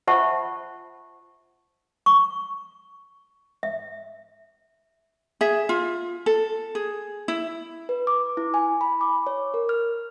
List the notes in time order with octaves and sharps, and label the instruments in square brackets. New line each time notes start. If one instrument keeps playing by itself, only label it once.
[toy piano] F4 C5 E5 F#5 A5 C#6
C#6
E5
[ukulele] G#4 E5
F4
A4
G#4
E4
[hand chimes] B4
D6
E4
G#5
B5
D6
C#5
A#4
F6